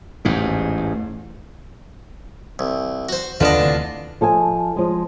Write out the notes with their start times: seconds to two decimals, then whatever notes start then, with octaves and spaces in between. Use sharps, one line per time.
0.25 A1 E2 G#2
2.59 C2
3.09 F#4 C5
3.40 D#2 D3 D4 F4 B4 D#5
3.60 D2 C3 E3
4.21 F3 A4 D#5 G#5
4.76 F3 G#3